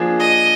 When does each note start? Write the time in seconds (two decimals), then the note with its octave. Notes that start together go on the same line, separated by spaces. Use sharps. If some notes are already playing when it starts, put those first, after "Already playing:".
Already playing: F3 A#3 D4 G#4
0.20 D#5